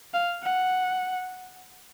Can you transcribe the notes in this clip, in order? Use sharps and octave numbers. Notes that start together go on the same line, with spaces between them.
F5
F#5